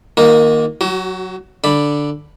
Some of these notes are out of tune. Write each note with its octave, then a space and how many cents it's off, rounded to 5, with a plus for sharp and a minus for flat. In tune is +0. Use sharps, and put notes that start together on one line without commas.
D#3 +0 A#3 +0 F4 +45
F#3 +0 F#4 +35
D3 +0 D5 +0 B5 +0